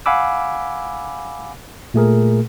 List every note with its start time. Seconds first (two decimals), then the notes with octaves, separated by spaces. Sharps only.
0.06 F5 F#5 G#5 B5 D6 E6
1.94 A#2 A3 G#4 A#4